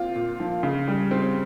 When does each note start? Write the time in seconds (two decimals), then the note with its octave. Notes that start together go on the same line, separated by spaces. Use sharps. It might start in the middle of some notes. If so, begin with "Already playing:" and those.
Already playing: A#2 C4 F4
0.16 A#2
0.40 F3
0.63 C#3
0.88 G3
1.11 C4